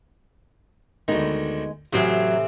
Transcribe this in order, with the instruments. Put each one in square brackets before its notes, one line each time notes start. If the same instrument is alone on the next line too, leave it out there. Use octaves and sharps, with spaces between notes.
[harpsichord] D2 D#3 [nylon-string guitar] G#3 B3 D#4
[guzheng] A2 E3 [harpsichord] C3 C4 C6 [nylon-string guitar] F#3 F#4